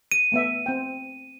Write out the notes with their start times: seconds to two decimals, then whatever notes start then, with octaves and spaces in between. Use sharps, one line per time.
0.12 D#7
0.32 A3 B3 E5
0.66 C4 G5